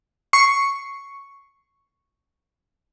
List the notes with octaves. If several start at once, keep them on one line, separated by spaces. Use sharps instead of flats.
C#6 C7 C#7